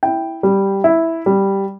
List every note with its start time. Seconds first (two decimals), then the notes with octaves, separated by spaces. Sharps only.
0.03 E4 G5
0.43 G3
0.84 E4
1.26 G3